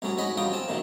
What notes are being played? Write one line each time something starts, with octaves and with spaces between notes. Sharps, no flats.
C2 A2 F#3 C#4 G#4
G#2 F#4 C#5 D#5 B5
C2 C#3 F#3 F4 G5 D#6
C4 A5
F#2 A2 D3 D#3